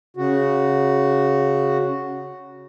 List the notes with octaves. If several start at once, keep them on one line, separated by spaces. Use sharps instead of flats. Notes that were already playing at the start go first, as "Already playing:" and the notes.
C#3 F#4